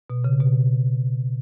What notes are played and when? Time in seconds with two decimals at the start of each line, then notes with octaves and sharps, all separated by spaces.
0.10 B2
0.24 C#3
0.41 B2